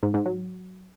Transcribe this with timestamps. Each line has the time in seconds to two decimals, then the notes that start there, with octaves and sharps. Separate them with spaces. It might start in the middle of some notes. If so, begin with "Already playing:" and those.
0.03 G#2
0.14 G#2
0.26 F#3